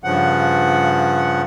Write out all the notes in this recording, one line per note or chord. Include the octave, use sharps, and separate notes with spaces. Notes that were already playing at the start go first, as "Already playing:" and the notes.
G2 C#3 F3 F#5